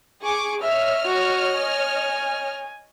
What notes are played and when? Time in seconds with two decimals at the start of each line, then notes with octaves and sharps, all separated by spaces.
0.23 G#4 C#6 D6
0.63 C#5 D#5 E5 F6
1.06 F#4
1.58 G#5